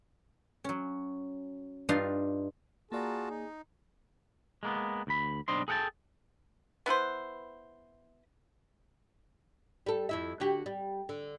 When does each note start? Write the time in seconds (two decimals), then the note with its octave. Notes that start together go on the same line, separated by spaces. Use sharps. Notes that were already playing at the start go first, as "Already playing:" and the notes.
0.64 F#3 C#4
1.89 G2 D4 D#4 F4 F5 C6
2.92 A#3 F4 F#4 G#4 D5 A5 A#5
3.30 D#4
4.63 G#3 A#3 B3
5.07 D2 B5
5.48 B1 G3 D4 C5 D#5 C6
5.68 G#4 A4 F#5 G5 A5
6.86 B3 E4 B4 C5
9.86 G3 A4
10.09 F2 E4 E5
10.40 D3 F#4 G4
10.66 G3
11.09 D3